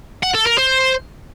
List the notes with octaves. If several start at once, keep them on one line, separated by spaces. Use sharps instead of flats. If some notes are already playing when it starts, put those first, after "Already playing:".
F#5
A4
A#4
C5